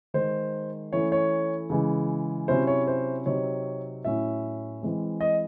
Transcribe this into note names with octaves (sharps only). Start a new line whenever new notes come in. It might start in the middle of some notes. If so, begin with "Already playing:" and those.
D#3 G#3 D#4 C5
E3 A3 C#4 E4 C#5
C#5
C#3 E3 G#3
C3 F#3 C#4 E4 C5
C#5
C5
C3 F#3 C4 D#4 C#5
A2 F#3 C#4 E4 E5
E3 G#3 C4
D#5